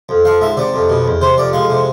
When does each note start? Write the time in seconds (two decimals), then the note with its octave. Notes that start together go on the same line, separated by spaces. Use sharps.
0.09 F2
0.25 F3 F5
0.41 G#2 E5
0.57 C3 D5
0.74 F2
0.89 B2
1.05 E2
1.21 C3 C5
1.37 F2 D5
1.53 G#3 F5
1.70 C3